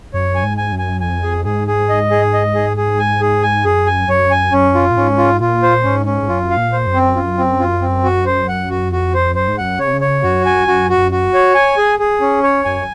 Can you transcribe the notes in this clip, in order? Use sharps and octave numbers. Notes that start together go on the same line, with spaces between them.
F#2 C#5
G#5
G#2
G#5
F#2
G#5
F2 G#5
G#4
G#2 G#4
G#4
D#5
G#4
D#5
G#4
G#4
G#5
G#4
G#5
F#2 G#4
G#5
F#2 C#5
G#5
F#2 C#4
F4
A#2
G#2 C#4
F4
A#2 F4
C5
G#2 C#4
C#4
G#2
F#2 F4
F5
A#2
C5
F#2
C4
F4
C4
F4
C4
F#4
C5
F#5
F#4
F2 F#4
C5
F#2 C5
G#2
F#2 F#5
C#3 C#5
C3
C#3
C#5
F#2 F#4
G#5
F#2 F#4
F#4
F#2
F#4
C#5
G#5
G#4
G#4
C#4
C#5
F#2 G#5